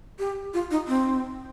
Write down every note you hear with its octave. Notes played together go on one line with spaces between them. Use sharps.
G4
F4
D#4
C4